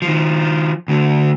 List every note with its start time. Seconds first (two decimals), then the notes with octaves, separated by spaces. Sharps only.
0.02 D#3 F3
0.88 D2 D3